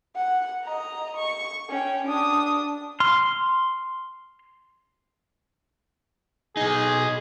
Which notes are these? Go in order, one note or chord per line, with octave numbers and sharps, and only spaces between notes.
F#5
D#5 A#5
C#6
C#4 G5
D4 D#6
C6 F6
B2 D#4 G#4